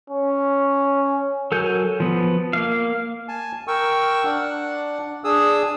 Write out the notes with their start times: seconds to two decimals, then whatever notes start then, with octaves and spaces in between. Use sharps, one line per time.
0.10 C#4
1.52 F#3 A4 A#4 G#5 G6
2.00 F3 B3
2.53 A#3 F5
3.28 G#5 A5
3.67 A#4 G5 C#6 E6
4.24 D4 F#5
5.24 D4 G#4 D#6 E6